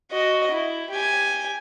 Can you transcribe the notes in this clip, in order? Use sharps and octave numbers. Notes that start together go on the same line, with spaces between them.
F#4 D#5
E4
G4 G#5